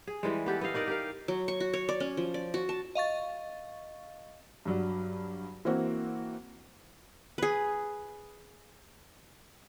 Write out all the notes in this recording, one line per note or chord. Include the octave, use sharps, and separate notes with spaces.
G#4
E3 G3 G#3
B3 G4 A4
B3 G4 D#5 F5
D#4 A#4 D5 D#5
G4 A#4 F5
F#3
C#6
F#4
C#5
D5
C#4
F3
D5
F#4
A5
D#5 F5 C#6 A6
G2 F#3 D5
E3 A#3 C4 F#4
G#4 B4